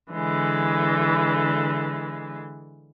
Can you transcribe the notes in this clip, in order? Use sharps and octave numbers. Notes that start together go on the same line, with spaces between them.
D3 E3 G#3